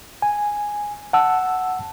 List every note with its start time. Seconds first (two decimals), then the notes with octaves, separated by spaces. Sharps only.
0.22 G#5
1.13 F#5 A5 E6